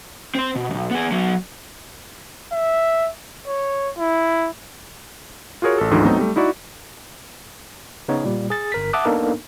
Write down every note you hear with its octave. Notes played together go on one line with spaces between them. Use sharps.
C4 C5
B2
B1 F#2
B3 G#4
F#3 B3
E5
C#5
E4
F4 F#4 G#4 A#4 C#5
A1 A4
G#1 D2 G#2 D3 E3 F#3
F#3 A3 B3 C4 D#4
G3 A3
D#4 E4 F#4 D5
C#3 B3 D#4 C#5
A#2 G3
G#4 A6
G1 A#4 B6
E5 F#5 A5 D6 D#6 F#6
A#3 B3 D4 D#4 A4 A#4